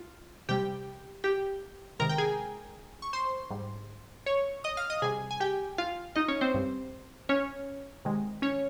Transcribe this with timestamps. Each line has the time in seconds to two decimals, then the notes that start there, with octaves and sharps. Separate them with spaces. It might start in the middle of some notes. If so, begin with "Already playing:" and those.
Already playing: F4
0.49 C3 G3 G4 G5
1.24 G4 G5
1.99 C3 D#3 G#3 A#4 A#5
2.09 G5
2.18 G#4 G#5
3.02 C#6
3.13 C5 C6
3.50 G#2 G3
4.26 C#5 C#6
4.64 D#5 D#6
4.77 F5 F6
4.90 D#5 D#6
5.02 C3 G3 G#4 G#5
5.31 G#5
5.40 G4 G5
5.78 F4 F5
6.16 D#4 D#5
6.28 C#4 C#5
6.41 C4 C5
6.54 G2 G3
7.29 C#4 C#5
8.05 C3 D#3 G#3
8.42 C#4 C#5